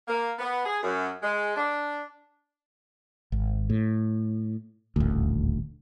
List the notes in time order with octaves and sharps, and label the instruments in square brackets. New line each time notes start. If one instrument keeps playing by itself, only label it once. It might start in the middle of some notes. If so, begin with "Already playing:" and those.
[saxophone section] A#3
B3
G#4
F#2
G#3
D4
[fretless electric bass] G#1
A2
D#1 A1 D2